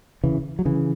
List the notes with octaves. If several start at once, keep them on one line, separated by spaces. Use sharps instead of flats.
C#3 E3
F#3
C#3 E3